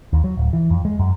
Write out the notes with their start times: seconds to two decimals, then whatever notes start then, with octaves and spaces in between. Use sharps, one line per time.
0.13 D#2
0.24 F#3
0.37 D1
0.53 E3
0.70 F2
0.85 G#3
0.99 F#2